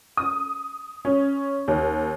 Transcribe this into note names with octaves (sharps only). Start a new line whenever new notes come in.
D#6
C#4
D#2